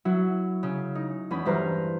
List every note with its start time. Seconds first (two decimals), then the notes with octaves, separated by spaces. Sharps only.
0.05 F#3 E4 F#4
0.63 C#3
0.95 D#4
1.31 E2 C#4 B5
1.45 G2 E3 B4 C5 A#5 F6